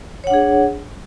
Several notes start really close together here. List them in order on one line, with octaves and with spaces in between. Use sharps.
C#5 F#5 D4 G#4